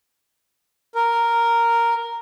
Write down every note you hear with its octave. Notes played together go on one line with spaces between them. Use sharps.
A#4